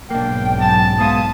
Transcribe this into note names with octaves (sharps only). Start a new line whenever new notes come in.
B1 G#2 A#3 D4 G5
F#2 A5
G#3 B3 F5 A5 D#6